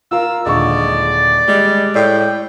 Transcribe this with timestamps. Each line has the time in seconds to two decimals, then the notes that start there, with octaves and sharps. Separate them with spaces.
0.11 F4 A#4 F5 E6
0.46 D#1 D3 G#3 D5 C#6
1.48 G3 G#3
1.95 A2 D5 G5